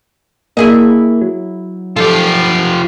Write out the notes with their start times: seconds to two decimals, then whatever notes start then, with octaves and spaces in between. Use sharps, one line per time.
0.57 A#3 E4 G#4 D#5
1.21 F#3
1.97 F3 F4 G4 A4